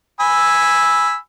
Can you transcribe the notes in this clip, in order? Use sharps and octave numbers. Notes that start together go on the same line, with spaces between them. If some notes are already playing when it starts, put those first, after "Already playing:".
G#5 B5 E6